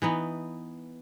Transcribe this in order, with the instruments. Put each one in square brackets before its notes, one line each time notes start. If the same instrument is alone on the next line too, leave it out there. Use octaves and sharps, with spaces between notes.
[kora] E3 B3 D#4